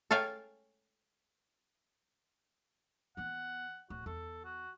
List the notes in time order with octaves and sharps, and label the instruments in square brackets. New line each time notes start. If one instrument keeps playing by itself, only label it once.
[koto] A4 C#5 F5 G5 G#5
[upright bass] E3 B3 [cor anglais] F#5
[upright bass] D1 [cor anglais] F#4
[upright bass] E2 [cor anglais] A4
[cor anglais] F#4